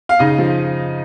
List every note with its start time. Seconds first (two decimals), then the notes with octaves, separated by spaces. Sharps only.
0.09 F5
0.19 C#3 D#4 D#5
0.38 F3